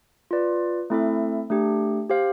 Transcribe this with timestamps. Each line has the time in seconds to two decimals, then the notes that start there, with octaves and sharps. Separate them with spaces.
0.31 F4 B4 D5
0.90 A3 C4 E4 A4 E5
1.50 A3 D4 G4
2.10 G4 C5 F5